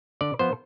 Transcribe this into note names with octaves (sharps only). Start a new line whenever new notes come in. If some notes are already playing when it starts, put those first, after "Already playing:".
D3 D5
F3 B3 C5